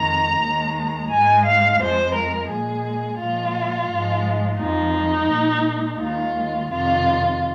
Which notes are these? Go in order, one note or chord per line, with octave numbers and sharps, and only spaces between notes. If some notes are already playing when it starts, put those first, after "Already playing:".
Already playing: F2 D#3 G#3 A#5
D#2 D#3 G#3
G#2 G#3 G#5
F5
F2 F3 G#3 C5
A#4
A#2 G#3 G#4
A#2 F3 G#3 F4
G#2 F3 G#3
F2 F3 G#3 D#4
A#2 G#3
D#2 D#3 G#3 F4
F2 C3 D#3 F4